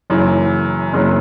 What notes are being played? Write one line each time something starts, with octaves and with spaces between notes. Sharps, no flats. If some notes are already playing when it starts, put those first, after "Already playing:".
F#1 F#2 E3
F#1 F#2 E3